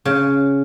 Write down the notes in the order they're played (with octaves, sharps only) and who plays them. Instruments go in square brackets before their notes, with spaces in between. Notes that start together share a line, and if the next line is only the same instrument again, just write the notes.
[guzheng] C#3